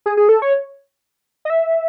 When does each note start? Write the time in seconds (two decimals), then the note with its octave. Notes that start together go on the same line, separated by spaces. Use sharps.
0.06 G#4
0.17 G#4
0.29 A4
0.42 C#5
1.45 D#5
1.50 E5